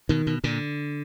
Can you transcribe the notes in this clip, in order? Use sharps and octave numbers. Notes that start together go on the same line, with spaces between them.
B2 D#3
B2
A#2 D3